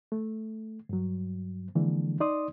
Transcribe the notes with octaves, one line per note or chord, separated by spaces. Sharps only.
A3
G2 F#3
D3 E3 F3 G#3 A#3 D4
D#4 D5 C6 D#6